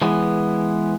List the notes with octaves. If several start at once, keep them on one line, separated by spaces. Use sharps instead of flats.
E3 G#3 B3